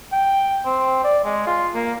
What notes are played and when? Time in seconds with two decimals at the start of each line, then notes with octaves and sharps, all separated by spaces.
0.12 G5
0.65 C4
1.04 D5
1.25 G#3
1.47 F4
1.75 A#3